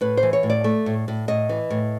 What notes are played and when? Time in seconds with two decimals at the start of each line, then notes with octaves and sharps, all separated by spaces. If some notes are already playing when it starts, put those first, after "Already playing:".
0.01 A2 B4
0.17 C5
0.23 E3
0.33 C#5
0.43 A2
0.50 D5
0.64 A3
0.86 A2
1.08 A2
1.28 A2 D#5
1.49 E3
1.70 A2